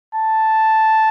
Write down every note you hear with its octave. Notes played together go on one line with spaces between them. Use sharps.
A5